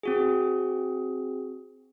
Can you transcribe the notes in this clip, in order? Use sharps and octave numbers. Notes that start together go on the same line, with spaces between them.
C4 F#4 G#4